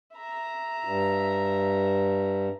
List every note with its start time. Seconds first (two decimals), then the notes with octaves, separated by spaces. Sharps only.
0.14 E5 A#5
0.85 G2